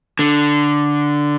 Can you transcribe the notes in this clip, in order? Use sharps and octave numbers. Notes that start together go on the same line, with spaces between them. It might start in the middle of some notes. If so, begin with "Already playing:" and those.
D3